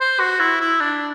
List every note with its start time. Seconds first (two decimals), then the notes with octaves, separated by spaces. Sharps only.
0.01 C5
0.20 F#4
0.40 E4
0.61 E4
0.81 D4